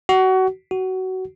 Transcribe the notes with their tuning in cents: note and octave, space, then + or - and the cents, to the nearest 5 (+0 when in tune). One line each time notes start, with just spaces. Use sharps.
F#4 +25
F#4 +20